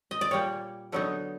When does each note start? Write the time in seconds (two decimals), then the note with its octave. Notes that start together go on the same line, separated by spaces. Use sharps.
0.11 D#5
0.21 D5
0.31 A#2 G3 A#3 C#5
0.92 D3 F#3 B3 D#4